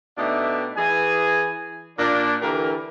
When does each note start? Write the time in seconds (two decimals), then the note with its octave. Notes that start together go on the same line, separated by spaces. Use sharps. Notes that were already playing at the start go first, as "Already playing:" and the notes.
0.18 B2 A3 D4 D#4 G4 E5
0.77 E3 G#4 G#5
1.99 A#2 D4
2.41 D3 E3 G4 A#4